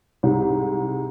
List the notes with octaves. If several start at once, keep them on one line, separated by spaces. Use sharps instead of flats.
C2 G#2